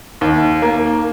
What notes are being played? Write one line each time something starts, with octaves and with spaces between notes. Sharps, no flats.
D#2
A#3